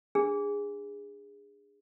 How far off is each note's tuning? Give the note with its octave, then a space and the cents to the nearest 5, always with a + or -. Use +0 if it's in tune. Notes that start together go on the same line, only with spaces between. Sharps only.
D4 +0 G#4 -20